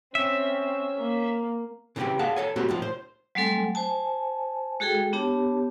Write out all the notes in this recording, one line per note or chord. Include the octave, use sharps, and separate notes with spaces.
C4 C#4 E5
A#3
C#3 E3 A3 C4 G4 G5
G#4 D5 F5 F#5 A5
A4 C#5 G#5
F#3 A3 A#3 C4 F#4 G4
C2 A2 F3
C5
F#3 G3 A3 C4 A4 G#5
C5 G#5 A5
G#3 F#4 G#4 A4 G5
B3 D4 G4 C#5 A5